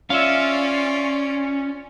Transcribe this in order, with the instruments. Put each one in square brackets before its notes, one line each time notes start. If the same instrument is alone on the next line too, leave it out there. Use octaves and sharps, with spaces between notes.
[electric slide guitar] C#4 [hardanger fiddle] F4 D5 [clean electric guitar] E5 F5